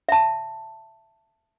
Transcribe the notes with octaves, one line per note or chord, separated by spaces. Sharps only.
E5 A5